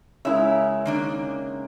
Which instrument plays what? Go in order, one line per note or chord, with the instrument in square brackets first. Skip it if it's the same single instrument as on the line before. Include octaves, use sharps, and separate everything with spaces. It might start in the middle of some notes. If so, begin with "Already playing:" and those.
[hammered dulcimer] C#3 G#3 A#4 [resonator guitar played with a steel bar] E4 E5
[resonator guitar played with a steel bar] D#3 A#3 D4